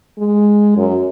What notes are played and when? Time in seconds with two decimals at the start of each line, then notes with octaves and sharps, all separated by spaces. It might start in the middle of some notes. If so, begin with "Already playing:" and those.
0.19 G#3
0.77 F#2